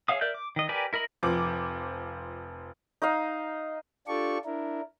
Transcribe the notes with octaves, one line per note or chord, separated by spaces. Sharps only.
G#4 C#5 E5 F5 D#6
A#4 D5 E5 G6
D6
D#3 D#5
G4 A#4 B4 D5 G#5
E4 A#4 D#5 B5
F1 F3 D6
D#4 D#5 F5
D4 F4 G4 A4 D5 C#6
D4 E4 A#4